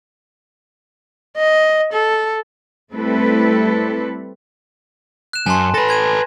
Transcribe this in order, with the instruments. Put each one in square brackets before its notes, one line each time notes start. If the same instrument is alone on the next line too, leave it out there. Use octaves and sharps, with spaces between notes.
[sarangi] D#5
A4
[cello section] G3 A3 C4 E4 A4 B4
[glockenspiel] F#6 E7
[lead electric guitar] F#2 [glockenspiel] G#5 A5 C6
[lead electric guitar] A4 B4 [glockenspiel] A6 A#6
[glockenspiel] A#5 G#6 D#7